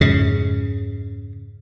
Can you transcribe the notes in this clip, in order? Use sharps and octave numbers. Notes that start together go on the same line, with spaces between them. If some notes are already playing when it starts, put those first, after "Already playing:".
F2 G#2 C#3